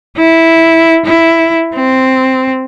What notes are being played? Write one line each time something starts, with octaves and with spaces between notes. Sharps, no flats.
E4
E4
C4